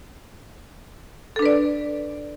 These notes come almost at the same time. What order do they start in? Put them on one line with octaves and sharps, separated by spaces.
A4 D4 B4 D5